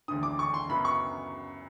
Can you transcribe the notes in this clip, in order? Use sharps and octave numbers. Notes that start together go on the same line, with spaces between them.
E1 D2 D3 D#6
D6
C#6
C6
F#2 C#3 F#3 B3 B5
C#6